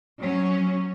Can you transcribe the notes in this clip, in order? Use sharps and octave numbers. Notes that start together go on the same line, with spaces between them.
F#3 C#4